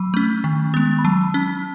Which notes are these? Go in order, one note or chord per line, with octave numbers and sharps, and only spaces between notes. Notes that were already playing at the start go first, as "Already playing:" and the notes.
Already playing: F#3 B5
A3 C#4
D#3
G#3 B3
B5
F#3 A5
C#4